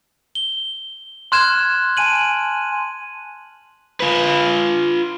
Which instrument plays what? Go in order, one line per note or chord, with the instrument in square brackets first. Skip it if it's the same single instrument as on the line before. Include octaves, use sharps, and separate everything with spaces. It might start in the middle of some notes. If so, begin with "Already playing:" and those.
[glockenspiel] G7
C6 F6 F#6 G#6 E7
G#5 A5 D#7 F#7
[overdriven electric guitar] F4 B4